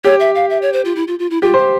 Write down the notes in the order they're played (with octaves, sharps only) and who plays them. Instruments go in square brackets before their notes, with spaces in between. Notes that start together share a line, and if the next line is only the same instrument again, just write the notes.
[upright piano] G4 [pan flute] C#5
[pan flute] E5
F5
E5
C#5
C5
F4
E4
F4
F4
E4
[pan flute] F4 [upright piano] G4
[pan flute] G4 [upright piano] C5